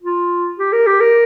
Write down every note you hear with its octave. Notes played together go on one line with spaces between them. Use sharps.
F4
G4
A#4
G4
A#4